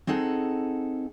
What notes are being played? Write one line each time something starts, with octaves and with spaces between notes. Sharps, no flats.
C4 D#4 G#4 A4 F#5